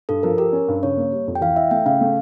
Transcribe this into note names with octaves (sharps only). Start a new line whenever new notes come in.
G2 A4
F3 A#4
G4 A#4
C#4
G2
C#3 C#5
A#3
G3
F2
G5
E3 F5
E4 E5
A3 G5
C#3 F5
A3